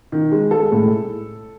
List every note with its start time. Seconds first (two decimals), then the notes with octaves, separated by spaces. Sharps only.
0.12 D#3
0.32 G#3
0.51 G#3 A4
0.72 A2